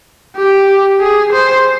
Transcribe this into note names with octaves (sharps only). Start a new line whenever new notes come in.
G4
G#4
C5